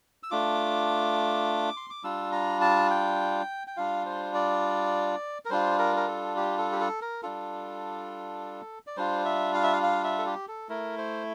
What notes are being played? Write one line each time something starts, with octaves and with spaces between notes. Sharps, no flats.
E6
A3 D4 F4 D6
C6
D6
G3 D4 F4 E6
A#5
A5
G5
G5
G3 D4 F4 F5
C5
D5
A#4
G3 D4 F4 C5
A#4
A#4
A4
G4
A4
G4
A4
A#4
G3 D4 F4 A4
D5
G3 D4 F4 C5
E5
F5
E5
F5
F5
E5
A4
G4
A4
A3 E4 A#4
C5